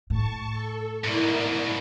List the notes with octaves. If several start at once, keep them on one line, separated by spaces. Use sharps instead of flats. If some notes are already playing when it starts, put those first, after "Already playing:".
A2 A5 C#6
A4
G#2 B2 E4 A#4 D5